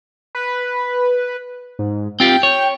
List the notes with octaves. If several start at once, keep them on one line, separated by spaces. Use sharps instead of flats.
B4
G#2
C4 F4 G4 G5
C#5